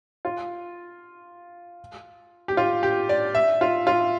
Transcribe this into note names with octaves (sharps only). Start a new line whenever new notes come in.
F4
G4
F4
G4
D5
E5
F4
F4